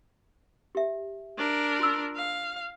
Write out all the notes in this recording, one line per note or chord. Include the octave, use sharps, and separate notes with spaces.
G4 E5
D4 A#4
F4 C6 E6
F5